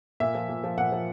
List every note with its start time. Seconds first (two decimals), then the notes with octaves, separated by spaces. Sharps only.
0.20 A#2 E5
0.35 F3
0.49 A#2
0.64 F3
0.78 A#2 F#5
0.92 F3